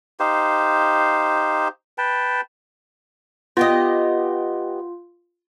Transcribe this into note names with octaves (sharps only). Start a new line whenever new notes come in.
D#4 G4 C5 F5
B4 G5 A5
B3 F4 G4 D#5